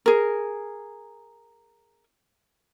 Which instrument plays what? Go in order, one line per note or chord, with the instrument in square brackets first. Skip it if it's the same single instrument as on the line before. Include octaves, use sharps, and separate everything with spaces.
[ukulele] G#4 A#4